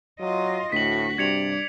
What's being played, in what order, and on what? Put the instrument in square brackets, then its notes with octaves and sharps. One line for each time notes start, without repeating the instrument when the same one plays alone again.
[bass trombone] F#3 [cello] F4 D#5
[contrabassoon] D2 [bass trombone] A2 [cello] F#4 [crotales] B6 F#7
[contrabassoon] G2 [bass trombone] C3 [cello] D5 [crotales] G#6 C#7 F7